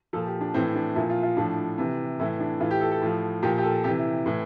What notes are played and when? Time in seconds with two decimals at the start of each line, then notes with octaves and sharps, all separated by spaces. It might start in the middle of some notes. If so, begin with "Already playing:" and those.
0.13 A#2 F3 A4
0.26 G4
0.41 D4
0.54 A2 E3 C4
0.75 D4
0.95 A#2 F3 E4
1.10 F4
1.23 F4
1.37 A2 F3 D4
1.78 C3 E3
2.19 A2 E3 E4
2.40 D4
2.60 A2 E3 F4
2.71 G4
2.81 A4
2.91 A4
3.02 A2 F3
3.43 A#2 F3 G4
3.58 G4
3.64 A4
3.84 C3 G4
3.88 E3
3.98 E4
4.26 A2 E3